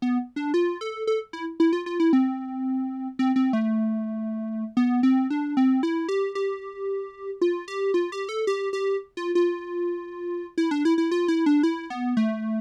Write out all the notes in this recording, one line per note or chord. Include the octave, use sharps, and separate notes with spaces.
B3
D4
F4
A4
A4
E4
E4
F4
F4
E4
C4
C4
C4
A3
B3
C4
D4
C4
E4
G4
G4
F4
G4
F4
G4
A4
G4
G4
F4
F4
E4
D4
E4
E4
F4
E4
D4
E4
B3
A3